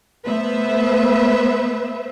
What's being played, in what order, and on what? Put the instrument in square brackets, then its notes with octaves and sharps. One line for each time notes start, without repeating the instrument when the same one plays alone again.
[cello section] A3 B3 B4 C5 E5